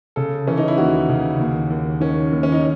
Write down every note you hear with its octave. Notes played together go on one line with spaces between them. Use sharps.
C#3 A4
E3 C#4
D#4
E4
D#2 F#4
C#3
D#2
D#2
D#3 C#4
D#2
C#4
D#4